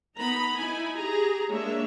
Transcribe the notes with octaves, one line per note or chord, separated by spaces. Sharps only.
B3 D#4 A#5 B5
D#4 E4 G#5 B5
G4 G#4 A#5
G#3 A#3 D4 C#5 E5